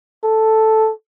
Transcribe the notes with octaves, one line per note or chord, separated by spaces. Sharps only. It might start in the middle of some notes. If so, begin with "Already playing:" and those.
A4